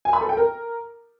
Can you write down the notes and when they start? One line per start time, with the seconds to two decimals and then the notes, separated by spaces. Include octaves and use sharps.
0.05 G#5
0.13 B5
0.21 A4
0.29 G5
0.37 A#4